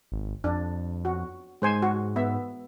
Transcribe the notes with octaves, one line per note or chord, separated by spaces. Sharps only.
G#1
F2 D4
F#4
G#2 G#3 C5 G#5
F#4
B3 E5